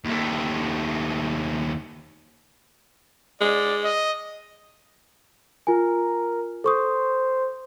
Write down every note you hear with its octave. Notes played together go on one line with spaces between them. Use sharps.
D#2 A3
G#3 D5
D#5
F4 A#4 G#5
A4 C5 C#6 D#6